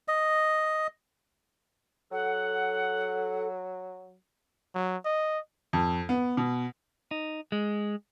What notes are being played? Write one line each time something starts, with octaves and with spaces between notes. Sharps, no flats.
D#5
F#3 A4 F#5
F#3
D#5
F2
B3
B2
D#4
G#3